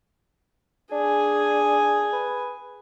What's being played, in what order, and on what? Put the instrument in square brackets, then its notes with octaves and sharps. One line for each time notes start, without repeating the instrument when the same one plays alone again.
[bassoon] D4 [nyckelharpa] G#4 G#5
[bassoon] B4